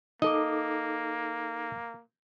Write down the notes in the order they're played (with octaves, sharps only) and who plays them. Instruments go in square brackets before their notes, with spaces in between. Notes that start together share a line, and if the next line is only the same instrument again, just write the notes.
[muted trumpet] A#3 [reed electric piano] D#4 A4 D6 [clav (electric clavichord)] D#5